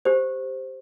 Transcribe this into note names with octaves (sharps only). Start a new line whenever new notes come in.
G4 C5